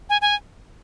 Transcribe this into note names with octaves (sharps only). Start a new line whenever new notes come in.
G#5
G#5